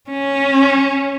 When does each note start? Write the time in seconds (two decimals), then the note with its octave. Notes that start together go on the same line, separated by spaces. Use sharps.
0.10 C#4